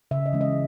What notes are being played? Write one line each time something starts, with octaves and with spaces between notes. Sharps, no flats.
C#3 E5
D#5
E3 G#3 C#4
D#5